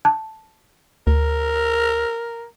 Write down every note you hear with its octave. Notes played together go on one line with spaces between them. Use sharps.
A5
D2 A#4